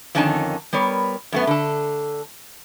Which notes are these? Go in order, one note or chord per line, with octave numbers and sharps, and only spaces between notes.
F2 D3 D#3 C#4 D#4 A5
G3 B3 A#4 C#5
F#2 A3 B3
D3 A4